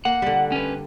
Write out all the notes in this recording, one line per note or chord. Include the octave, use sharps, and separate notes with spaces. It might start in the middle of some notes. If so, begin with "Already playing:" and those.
A#3 F#5
D3 G3
C#4 B4